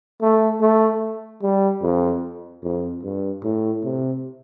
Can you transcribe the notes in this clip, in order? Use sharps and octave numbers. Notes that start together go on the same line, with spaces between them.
A3
A3
G3
F2
F2
G2
A2
C3